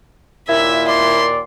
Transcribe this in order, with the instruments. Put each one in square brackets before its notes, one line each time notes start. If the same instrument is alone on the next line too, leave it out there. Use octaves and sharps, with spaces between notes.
[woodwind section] D#2 A#2 [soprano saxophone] E4 [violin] E5
[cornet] D5 [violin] C6